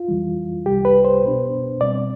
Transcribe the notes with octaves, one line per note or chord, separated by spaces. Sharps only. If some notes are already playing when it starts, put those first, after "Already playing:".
Already playing: F4
F2 E3 G3
C2 C3 G3 G4
B4
C5
B2 B3 D4
B2 G3 C4 D5